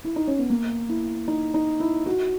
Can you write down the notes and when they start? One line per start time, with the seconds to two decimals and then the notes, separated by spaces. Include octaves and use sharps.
0.04 E4
0.16 D#4
0.27 C#4
0.39 B3
0.50 A#3
0.89 E4
1.28 D#4
1.54 D#4
1.80 E4
2.06 F#4